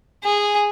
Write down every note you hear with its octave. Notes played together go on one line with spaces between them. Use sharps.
G#4